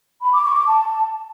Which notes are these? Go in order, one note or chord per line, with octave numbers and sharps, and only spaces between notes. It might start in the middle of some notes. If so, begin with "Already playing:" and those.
B5
D6
C#6
D6
A5